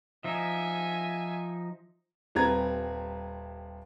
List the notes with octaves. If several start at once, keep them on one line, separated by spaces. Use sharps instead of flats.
F3 D#4 E5 G#5
D#1 G3 C4 B4 A#5 G#6